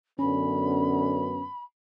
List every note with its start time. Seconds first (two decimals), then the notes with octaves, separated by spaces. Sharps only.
0.19 F#2 D3 B3 C#4 B5